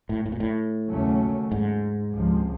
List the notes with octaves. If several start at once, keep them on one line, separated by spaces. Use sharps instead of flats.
A2
A2
A#2
A2
D#2 C#3 F#3 A3 C#4
G#2
C#2 C3 F3 G#3